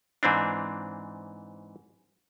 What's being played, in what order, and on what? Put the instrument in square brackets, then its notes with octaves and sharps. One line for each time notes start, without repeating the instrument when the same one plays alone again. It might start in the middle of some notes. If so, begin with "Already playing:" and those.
[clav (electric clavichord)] G#2 E3 C4 D4